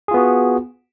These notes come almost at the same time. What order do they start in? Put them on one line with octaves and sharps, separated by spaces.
G#4 F4 B3 F#4